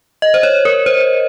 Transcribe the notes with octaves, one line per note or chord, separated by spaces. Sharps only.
D#5
C5
C#5
A#4
C5